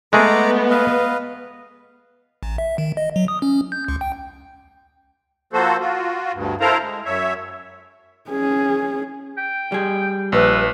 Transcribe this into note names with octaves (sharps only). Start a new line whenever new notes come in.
G#3 A3 B3 G#4 A#5 D6
B4 D#5 F5
A1
E5
D#3
D#5
F#3
D#6
C#4
G6
C#2
G5
F3 A#3 F#4 A4 C5
F4 F#4
D2 G2
E4 A4 A#4 C5 F5 A#5
G#3
F#2 C#5 E5
C#4 G#4
G5
G3 G#4
A#1 B4 E5